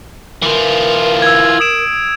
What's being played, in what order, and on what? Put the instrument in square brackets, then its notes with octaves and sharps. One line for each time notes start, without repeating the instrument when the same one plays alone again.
[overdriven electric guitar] E3 F4 [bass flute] A#4
[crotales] E6 G#6
D#6 D7 E7